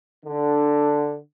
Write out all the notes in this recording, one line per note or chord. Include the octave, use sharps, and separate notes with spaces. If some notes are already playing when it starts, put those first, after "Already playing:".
D3